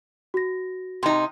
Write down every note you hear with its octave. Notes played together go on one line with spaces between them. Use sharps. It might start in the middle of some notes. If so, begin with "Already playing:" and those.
F#4 A#6
C3 D#4